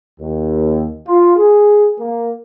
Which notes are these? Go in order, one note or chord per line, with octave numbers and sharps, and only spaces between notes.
D#2
F4
G#4
A#3